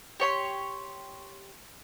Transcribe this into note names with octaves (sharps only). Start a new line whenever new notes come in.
G4 C#5 C6